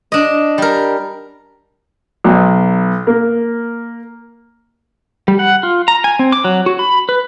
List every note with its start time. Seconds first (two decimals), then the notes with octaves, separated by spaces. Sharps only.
0.12 D4 D#5
0.58 G3 A#4
2.24 B1
3.07 A#3
5.28 G3
5.39 F#5
5.63 F4
5.88 A#5
6.04 G#5
6.19 C4
6.32 D6
6.44 F#3
6.66 F#4
6.79 B5
7.09 B4